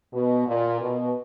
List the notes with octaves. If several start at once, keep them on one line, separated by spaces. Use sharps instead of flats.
B2
A#2
B2